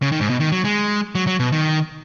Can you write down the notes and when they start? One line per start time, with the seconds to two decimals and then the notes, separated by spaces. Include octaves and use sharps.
0.02 C#3
0.12 D#3
0.21 G#2
0.30 B2
0.40 D#3
0.52 F#3
0.65 G#3
1.15 F#3
1.27 F#3
1.40 B2
1.52 D#3